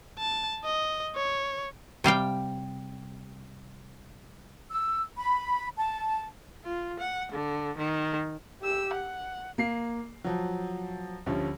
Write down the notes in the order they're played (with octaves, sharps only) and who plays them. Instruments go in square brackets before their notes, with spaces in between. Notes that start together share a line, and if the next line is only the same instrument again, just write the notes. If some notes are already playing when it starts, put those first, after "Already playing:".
[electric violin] A5
D#5
C#5
[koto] C3 G3 F5 G5
[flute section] E6
B5
A5
[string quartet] F4
F#5
D3
D#3
[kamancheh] G4 E6
F#5
[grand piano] A#3 C7
F3 F#3
D2 F3 G3 C#4